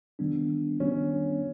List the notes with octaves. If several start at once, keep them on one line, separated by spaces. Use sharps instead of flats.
D#3 G3 B3 D4
D#3 G3 B3 C#4 D4